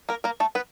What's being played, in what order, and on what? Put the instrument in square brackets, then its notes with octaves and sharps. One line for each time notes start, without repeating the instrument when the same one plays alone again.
[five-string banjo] A#3 A#4
A#3 A#4
A3 A4
B3 B4